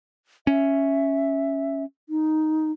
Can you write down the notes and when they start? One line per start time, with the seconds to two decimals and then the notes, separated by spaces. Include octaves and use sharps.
0.47 C#4 E5
2.09 D#4